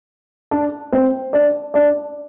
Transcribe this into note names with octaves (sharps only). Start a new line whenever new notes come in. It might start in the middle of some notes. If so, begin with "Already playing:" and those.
D4 D5
C4 C5
D4 D5
D4 D5